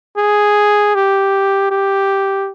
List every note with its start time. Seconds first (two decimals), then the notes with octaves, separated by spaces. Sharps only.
0.17 G#4
0.95 G4
1.71 G4